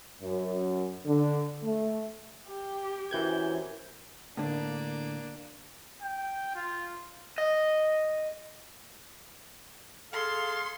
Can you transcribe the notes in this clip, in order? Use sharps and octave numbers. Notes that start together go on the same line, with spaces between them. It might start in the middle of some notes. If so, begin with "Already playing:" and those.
F#2
D3
A3
G4
F#2 C3 E3 G6 G#6
A2 D3 A#3 D4
G5
F4
D#5
G#4 A4 F5 C6